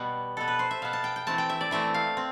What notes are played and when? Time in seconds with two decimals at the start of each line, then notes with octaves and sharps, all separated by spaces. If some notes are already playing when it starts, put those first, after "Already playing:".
Already playing: B2 G3 B3 G4
0.37 B2 B3 A4
0.48 B4
0.59 C5
0.71 E5
0.82 B2 B3 F5
0.93 A5
1.04 G5
1.16 G5
1.27 E3 A3 C4 A5
1.38 G5
1.49 E5
1.61 D5
1.71 E3 A3 C4 E5
1.94 F5
2.17 C4